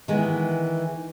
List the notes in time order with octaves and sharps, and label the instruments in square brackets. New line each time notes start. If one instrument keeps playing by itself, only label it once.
[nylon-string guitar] D#3 G#3 B3 [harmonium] E3